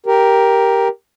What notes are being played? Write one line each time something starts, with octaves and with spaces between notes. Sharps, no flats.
G4 A#4